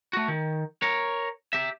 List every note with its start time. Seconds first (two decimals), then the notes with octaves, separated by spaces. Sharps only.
0.13 A3 F#4
0.28 D#3
0.82 A#4 C#5
1.53 G4 E5